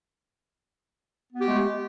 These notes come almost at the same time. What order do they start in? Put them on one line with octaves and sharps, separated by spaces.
B3 F#4 G4 A3 G#3